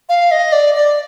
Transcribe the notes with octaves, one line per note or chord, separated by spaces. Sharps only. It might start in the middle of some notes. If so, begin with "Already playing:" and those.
F5
D#5
D5
D5